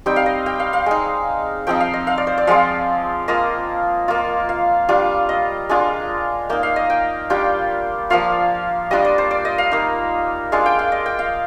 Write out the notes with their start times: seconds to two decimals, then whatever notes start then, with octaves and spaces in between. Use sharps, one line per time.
0.06 G3 C4 D#4 G5
0.16 F5
0.26 D#5
0.46 G5
0.60 F5
0.73 F5
0.86 G#3 D#4
1.67 F3 C4 D#4 G5
1.80 F5
1.94 D#5
2.07 F5
2.18 D5
2.27 C5
2.38 D5
2.47 F3 G#3 C4 F4 F5
3.28 A#3 F4 D#5
4.08 A#3 F4
4.49 F5
4.89 G3 D4 F4
5.29 D#5
5.69 G#3 D4 F4
6.49 A#3 D#4 G5
6.63 F5
6.76 D#5
6.90 G5
7.30 G3 D4 F4 G5
8.10 F3 A#3 F4 F5
8.91 G3 D4 F4 D#5
9.05 D5
9.18 C5
9.31 D5
9.45 D#5
9.58 F5
9.71 A#3 D#4
10.52 G#3 D4 F4 F5
10.66 G5
10.79 F5
10.92 D#5
11.06 G5
11.19 F5